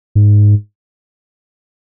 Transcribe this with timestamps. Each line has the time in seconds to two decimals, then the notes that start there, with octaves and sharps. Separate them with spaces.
0.15 G#2